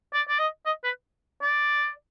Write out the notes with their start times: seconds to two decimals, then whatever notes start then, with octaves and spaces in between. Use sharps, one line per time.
0.14 D5
0.29 D5
0.39 D#5
0.66 D#5
0.84 B4
1.42 D5